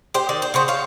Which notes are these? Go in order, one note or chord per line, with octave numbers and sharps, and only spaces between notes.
G4 C5
D#3 D5
C5
C#3 F#4 C5
C#5 F5